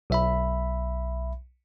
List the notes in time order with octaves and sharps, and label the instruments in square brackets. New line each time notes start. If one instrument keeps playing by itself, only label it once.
[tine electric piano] B1 E5 B5